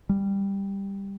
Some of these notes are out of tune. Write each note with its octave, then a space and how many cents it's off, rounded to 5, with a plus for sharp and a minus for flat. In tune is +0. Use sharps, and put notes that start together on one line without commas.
G3 +10